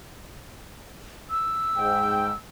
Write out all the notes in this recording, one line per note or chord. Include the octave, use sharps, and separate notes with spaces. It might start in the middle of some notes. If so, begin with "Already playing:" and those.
E6
G#2 G5